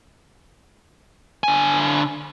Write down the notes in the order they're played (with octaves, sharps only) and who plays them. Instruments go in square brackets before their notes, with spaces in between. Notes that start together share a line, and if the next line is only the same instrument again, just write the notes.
[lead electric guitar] D3 G#5